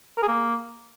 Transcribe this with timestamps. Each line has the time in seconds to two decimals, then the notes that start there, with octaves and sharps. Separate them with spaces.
0.18 A#4
0.23 G#4
0.28 A#3